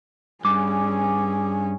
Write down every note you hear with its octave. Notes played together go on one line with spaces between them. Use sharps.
G2 C#4 G#4 D6